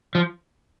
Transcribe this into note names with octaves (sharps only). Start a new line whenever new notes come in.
F3